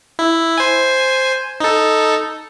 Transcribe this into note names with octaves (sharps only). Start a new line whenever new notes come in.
E4
C5 G#5
D#4 A4